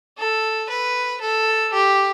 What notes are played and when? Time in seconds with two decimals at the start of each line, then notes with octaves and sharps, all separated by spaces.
0.18 A4
0.69 B4
1.21 A4
1.73 G4